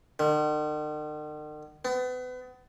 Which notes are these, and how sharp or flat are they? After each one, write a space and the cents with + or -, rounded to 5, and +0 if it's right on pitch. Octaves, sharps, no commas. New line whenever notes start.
D#3 -45
B3 +35